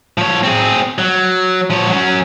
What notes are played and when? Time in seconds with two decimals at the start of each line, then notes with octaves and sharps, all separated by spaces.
0.18 F3 C#5
0.44 C4 G#4
0.99 F#3
1.70 F3 C#5
1.90 F#3 C#4